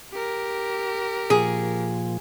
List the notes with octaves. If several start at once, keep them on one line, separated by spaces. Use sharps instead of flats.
G4 A#4
A#2 F3 G#4